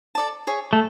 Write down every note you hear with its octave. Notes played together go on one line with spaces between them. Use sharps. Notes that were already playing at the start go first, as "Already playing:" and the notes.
A4 D5 A5
G#4 C#5 E5
A3